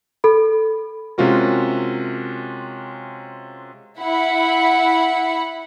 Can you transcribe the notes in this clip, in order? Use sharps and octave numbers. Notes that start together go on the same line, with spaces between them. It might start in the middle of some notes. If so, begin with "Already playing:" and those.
A4 B5
C3 G#3 C#4 F4 F#4 A#4
E4 F#5 B5